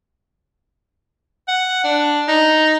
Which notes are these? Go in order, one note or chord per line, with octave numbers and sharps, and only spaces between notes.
F#5
D4
D#4